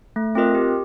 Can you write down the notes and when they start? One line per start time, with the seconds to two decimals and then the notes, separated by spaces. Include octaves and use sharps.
0.16 A3
0.35 C4 F4 A#4 D#5
0.55 G4